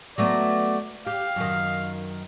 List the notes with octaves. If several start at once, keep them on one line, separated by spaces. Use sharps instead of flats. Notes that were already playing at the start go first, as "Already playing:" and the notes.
F#3 A3 B3 D5
G4 F5
F#2 D#3